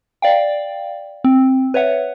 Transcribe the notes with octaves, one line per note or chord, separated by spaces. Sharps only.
D5 F5 G5
C4
B4 C#5 E5 F#5